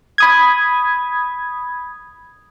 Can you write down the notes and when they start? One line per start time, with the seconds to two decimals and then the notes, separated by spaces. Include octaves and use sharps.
0.18 B5 D#6 G#6